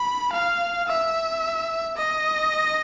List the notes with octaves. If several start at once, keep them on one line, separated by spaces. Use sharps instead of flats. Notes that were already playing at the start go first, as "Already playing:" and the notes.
Already playing: B5
F5
E5
D#5